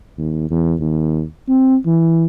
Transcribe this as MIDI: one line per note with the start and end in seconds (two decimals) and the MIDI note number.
0.18 0.47 39
0.50 0.74 40
0.80 1.22 39
1.49 1.76 60
1.86 2.25 52